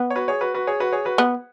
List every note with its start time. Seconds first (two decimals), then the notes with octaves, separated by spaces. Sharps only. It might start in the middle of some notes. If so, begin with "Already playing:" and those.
Already playing: B3
0.10 C#5
0.16 F#4 B4
0.28 G#4 C#5
0.41 F#4 B4
0.54 F#4 B4
0.67 G#4 C#5
0.80 F#4 B4
0.92 G#4 C#5
1.05 F#4 B4
1.18 B3